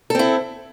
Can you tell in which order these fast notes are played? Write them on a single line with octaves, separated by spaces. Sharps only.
A4 C4 E4